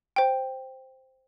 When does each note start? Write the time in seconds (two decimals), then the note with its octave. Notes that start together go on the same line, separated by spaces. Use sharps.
0.16 C5 G5